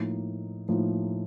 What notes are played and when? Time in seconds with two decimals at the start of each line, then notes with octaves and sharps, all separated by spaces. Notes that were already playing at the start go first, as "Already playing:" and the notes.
Already playing: A2 F3 A#3 D#4
0.69 A2 F3 A#3 D#4